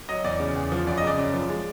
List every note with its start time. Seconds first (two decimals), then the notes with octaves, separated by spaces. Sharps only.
0.09 F#3 D#5
0.24 E2 D5
0.40 C#3
0.56 E2
0.72 F3
0.87 F#2 D5
0.98 D#5
1.03 C#3 D5
1.18 F#2
1.34 F3
1.49 G#3